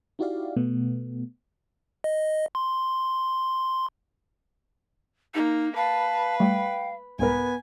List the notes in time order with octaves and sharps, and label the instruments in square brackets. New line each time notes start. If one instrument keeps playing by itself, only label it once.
[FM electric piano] D#4 E4 F#4 G4 D5 F5
B2 A3 B3
[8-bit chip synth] D#5
C6
[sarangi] A#3 [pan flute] D#4
[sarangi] B4 [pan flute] F5 [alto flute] A5
[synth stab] G3 A3 [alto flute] G5
[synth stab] C2 G#2 A#4 [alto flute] B3 [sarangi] G#5